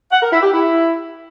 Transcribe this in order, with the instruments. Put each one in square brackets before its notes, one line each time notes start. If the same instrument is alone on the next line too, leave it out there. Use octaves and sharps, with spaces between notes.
[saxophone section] F#5
A#4
E4
G4
E4